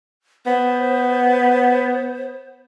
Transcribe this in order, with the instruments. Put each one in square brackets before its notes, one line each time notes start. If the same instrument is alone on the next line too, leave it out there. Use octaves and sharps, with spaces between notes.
[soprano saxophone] B3 [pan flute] C5